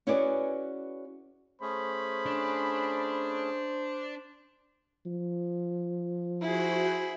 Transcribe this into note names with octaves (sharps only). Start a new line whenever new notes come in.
C#4 E4 F#4 G#4 B4 D5
A3 C#4 G#4 C5 B5
D4
F3
E4 F#4 G#4 C5